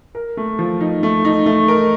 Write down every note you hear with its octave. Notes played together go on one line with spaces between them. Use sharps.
A#4
A3
F3
D#4
A3
D#4
A3
A#4